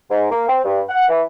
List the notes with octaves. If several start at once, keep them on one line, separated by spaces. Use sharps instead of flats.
G#2
A#3
C4
G2
F#5
E3